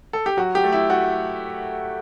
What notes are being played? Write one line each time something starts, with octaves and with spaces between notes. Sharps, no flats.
A4
G4
F#3 F#4
G4
A3
E4
A3 F#4